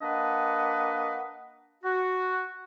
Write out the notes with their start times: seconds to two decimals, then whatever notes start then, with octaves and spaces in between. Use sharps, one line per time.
0.01 A#3 D4 B4 D#5 F#5
1.83 F#4